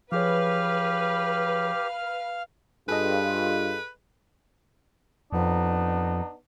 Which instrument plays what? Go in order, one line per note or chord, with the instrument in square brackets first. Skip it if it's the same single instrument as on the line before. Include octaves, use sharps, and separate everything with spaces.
[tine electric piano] F3 G#4 C#5 [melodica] G4 [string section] B4 [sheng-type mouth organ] F5 F6
[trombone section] G2 F4 [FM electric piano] G#4 A4 D#5 [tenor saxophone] B4
[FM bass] F2 [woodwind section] B3 D4 D#4